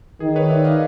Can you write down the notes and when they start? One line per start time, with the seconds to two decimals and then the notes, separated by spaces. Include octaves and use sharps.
0.20 D#3 G#4
0.36 B4 C#5
0.50 D5 E5
0.64 D#5 F5